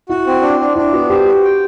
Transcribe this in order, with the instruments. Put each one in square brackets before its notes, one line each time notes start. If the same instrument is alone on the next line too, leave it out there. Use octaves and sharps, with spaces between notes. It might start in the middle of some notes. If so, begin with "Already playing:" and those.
[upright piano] E4 [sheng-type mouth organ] F#4
[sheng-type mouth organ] C4
D4
D4
[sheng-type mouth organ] D4 [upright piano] E4
[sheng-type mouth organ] B3 [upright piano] F#4
[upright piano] G4 [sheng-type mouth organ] C5
[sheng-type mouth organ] F#4
G5